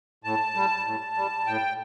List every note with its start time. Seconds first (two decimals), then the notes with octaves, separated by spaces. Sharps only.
0.24 A2 A5
0.55 G3
0.85 A2
1.16 G3
1.46 A2 G5